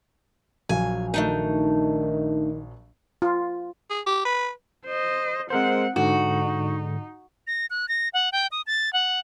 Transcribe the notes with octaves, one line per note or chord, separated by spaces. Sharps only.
A#1 F#3 F5 G#5
D#3 A3 D4 D#4
F4
G#4
G4
B4
C5 D#5
G#3 C4 A#4 C5 F#5
G#2 D3 D#4 F#4
A#6
F#6
A#6
F#5
G5
D#6
A6
F#5